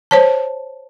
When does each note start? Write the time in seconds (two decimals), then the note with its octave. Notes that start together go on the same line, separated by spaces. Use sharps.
0.11 C5 C#5 A5